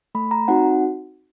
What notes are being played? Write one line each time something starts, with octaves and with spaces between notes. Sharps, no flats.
A3 B5
A#5
C4 D#4 F#4 F#5